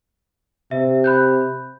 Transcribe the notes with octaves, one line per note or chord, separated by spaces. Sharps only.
C3 E5
B5 F#6 G6